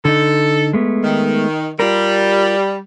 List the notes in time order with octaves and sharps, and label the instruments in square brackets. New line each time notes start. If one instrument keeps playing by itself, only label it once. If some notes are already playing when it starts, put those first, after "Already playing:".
[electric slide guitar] D3 D#4 [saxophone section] A4
[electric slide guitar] G#3 A3 B3
[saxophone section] D#3
[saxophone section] G3 [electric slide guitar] F4 A#4